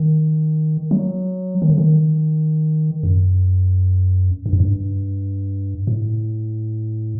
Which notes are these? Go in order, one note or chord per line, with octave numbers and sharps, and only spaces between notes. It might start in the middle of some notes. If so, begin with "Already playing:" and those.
Already playing: D#3
F#3
D#3
D3
D#3
F#2
G2
F#2
G2
A2